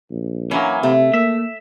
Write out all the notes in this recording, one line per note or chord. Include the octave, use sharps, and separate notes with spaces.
A#1
E3 F#3 A#3 C#4
C3 A3
A#3 E5